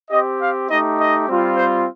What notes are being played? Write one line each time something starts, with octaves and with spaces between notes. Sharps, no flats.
C4 G4 D#5
F5
A3 D#4 G4 D#5
D#5
G3 C4 F4
C5